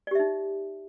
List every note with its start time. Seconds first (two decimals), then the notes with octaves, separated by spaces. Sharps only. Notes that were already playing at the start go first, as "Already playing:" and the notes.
0.07 D5
0.11 G4
0.15 E5
0.19 D#4